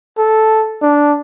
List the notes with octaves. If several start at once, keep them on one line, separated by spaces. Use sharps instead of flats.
A4
D4